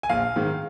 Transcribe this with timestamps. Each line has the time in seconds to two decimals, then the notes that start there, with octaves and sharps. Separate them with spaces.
0.03 G#5
0.09 A#1 F5
0.36 G#2 D#3 G#3